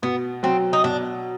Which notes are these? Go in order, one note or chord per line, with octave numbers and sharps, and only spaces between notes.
B2 B3
F#3 C4
D#4
B2 D4